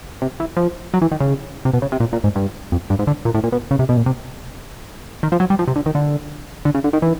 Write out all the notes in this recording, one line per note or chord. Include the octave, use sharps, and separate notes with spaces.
C3
E3
F3
F#3
E3
D#3
C#3
C3
B2
C#3
C3
A#2
A#2
G#2
G2
F2
G2
G#2
D3
A#2
A2
A#2
B2
C#3
C3
B2
A#2
C3
D#3
F3
F#3
G3
F3
C3
D3
D#3
D3
D3
C#3
D3
D#3
E3